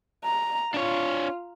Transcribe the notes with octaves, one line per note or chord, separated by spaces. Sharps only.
A#5
D4 F4 C#5